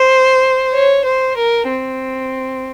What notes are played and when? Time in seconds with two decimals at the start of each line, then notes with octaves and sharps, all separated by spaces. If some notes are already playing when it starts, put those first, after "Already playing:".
Already playing: C5
0.74 C#5
1.05 C5
1.37 A#4
1.69 C4